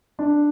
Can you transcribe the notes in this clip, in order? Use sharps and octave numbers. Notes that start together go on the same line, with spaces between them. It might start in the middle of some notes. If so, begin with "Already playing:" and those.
D4